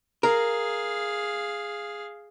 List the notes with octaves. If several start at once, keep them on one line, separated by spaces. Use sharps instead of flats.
G#4 A#4 F5